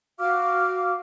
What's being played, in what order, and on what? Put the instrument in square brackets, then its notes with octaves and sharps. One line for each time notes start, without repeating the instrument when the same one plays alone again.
[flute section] F#4 F5 D6 F6